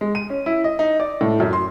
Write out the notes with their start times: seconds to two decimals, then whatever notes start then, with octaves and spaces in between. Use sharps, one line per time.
0.01 G#3
0.15 D#7
0.30 C#4
0.46 E4
0.64 D#5
0.79 D#4
1.00 D5
1.21 A2
1.40 F#2
1.53 C6